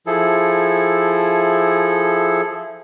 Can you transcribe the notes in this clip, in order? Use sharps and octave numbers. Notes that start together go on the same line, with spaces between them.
F3 E4 G#4 A4